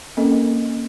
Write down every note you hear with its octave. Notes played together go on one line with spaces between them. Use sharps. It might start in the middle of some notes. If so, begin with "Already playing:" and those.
A#3 C4 C#4 A4 A#4 D#5